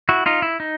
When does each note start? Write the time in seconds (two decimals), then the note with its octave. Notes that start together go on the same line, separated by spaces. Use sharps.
0.09 E4 F#4
0.26 D#4 F4
0.42 E4
0.60 D#4